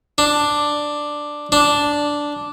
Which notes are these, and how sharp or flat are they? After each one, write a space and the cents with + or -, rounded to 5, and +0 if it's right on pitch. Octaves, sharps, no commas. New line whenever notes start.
D4 +5
D4 -5